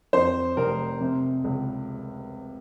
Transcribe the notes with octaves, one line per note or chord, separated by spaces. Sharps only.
F2 C5
F1 A#4
C3
C#2